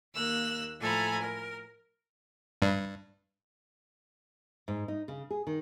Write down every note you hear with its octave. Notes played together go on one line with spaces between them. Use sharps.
D#2 A#3 E6 F#6
A2 F3 A4 G#5 A#5 B5
A#4
G2
G#2
D#4
C#3
G#4
D#3